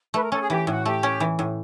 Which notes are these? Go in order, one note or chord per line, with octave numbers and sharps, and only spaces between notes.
A3 B4
A#4
C#4 A4
G#4
E3 G4
A2 F#4
A3 G4
C#4
E3
A2